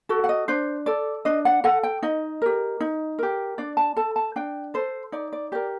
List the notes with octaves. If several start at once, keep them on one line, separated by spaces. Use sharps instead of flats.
F#4 A4
F#5
D#5
D4 C5
A4 D5
D4 D#5
F#5
A4 F#5
G5
D#4 D#5
G4 A#4
D#4
G4 A#4
D4 D5
A5
A4 A5
A5
D4 G5
A4 C5
D#4 D5
D5
G4 A#4 D5